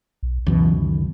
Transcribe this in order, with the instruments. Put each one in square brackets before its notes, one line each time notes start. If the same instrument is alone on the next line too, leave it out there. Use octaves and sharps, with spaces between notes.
[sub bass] B1
[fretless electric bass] C#2 F#2 B2 [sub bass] E3
[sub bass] D#3